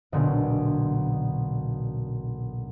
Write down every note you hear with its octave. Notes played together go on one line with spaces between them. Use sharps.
E1 B1 A#2 D3